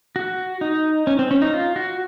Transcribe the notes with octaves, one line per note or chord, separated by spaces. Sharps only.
F#4
D#4
C#4
C4
C#4
D#4
F4
F#4